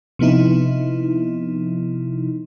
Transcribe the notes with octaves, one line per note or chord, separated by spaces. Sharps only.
C3 F3 B3 D#4 E4